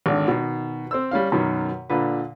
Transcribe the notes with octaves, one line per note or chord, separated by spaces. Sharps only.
G#1 D3
B2 D#3
C4 C5 E6
G3 C#4 F5
F#2 B2 D#3
A#2 D3 B4